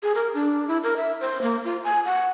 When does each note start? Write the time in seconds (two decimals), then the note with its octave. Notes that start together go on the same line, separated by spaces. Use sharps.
0.03 G#4
0.15 A#4
0.34 D4
0.68 E4
0.83 A#4
0.97 E5
1.21 C5
1.42 A#3
1.64 F4
1.84 G#5
2.05 F#5